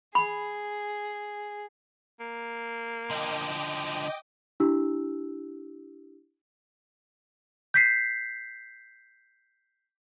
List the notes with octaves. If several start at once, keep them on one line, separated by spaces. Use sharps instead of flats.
G#4 B5
A#3
D3 F3 D#5 G5 D6
D4 E4 G4 E6
G6 B6 C7